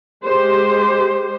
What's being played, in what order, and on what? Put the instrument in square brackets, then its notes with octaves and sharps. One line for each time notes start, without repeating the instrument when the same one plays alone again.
[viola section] G#3 G4 C5